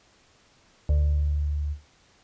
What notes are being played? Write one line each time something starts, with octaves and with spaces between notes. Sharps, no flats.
D2